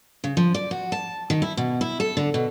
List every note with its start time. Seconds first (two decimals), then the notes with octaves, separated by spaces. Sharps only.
0.24 C#3
0.37 F3
0.54 D5
0.71 F#4
0.92 A5
1.30 D#3
1.42 E4
1.57 B2
1.81 E4
2.00 A4
2.17 D3
2.34 B2